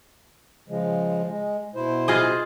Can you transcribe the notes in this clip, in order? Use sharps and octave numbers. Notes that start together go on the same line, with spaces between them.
C#3 F3 G#3
G#3
B2 E4 C5
F4 G#4 D#5